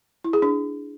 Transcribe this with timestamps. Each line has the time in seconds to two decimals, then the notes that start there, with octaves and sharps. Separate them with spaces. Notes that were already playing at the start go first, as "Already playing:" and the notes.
0.24 E4
0.33 G#4
0.42 D4